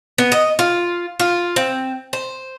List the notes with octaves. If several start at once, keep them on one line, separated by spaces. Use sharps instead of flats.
B3
D#5
F4
F4
C4
C5